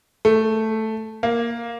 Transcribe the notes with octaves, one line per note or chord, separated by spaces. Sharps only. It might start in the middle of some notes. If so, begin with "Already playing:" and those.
A3
A#3